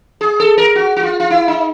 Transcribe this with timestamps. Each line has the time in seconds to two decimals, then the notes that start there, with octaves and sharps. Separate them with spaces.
0.21 G#4
0.40 A4
0.57 A#4
0.75 F#4
0.97 F#4
1.03 F4
1.20 F4
1.30 E4
1.48 D#4